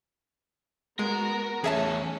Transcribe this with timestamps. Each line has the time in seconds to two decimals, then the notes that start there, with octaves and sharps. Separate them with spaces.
0.99 G#3 B3 F#4 A#4
1.64 E2 A3 C#4 G#4 A4 E5 A5